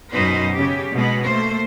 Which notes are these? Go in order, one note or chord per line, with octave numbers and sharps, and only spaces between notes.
F#2 B2 D#4 B4 C5
C#3 G4
B2 G#3 B3
A3 A#3 C5